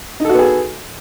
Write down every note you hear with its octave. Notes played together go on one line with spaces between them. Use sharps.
B3 D#4 F#4 G#4 A4